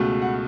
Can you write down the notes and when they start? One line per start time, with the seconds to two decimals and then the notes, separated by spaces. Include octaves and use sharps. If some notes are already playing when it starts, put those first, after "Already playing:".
Already playing: C#2 B2 A3
0.22 F#5